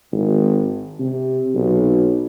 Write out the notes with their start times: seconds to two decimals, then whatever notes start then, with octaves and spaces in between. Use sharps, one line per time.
0.12 G#1
0.99 C3
1.55 B1